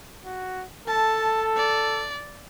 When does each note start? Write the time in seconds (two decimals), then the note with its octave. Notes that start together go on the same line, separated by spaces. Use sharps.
0.25 F#4
0.88 A4 A5
1.57 D5